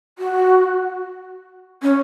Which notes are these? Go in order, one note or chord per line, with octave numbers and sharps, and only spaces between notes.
F#4
C#4